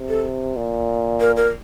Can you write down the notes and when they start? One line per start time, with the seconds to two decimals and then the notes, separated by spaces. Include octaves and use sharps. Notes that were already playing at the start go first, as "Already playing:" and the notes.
Already playing: C3
0.09 A4
0.56 A#2
1.20 A#4
1.36 A#4